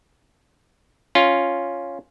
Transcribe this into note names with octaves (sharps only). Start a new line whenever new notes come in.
C#4 F4